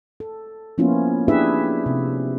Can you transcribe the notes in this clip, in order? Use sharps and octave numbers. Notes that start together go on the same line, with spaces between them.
A4
F3 A#3 B3 C#4 E4 F4
D4 E4 G4 G#4 B4 E5
C3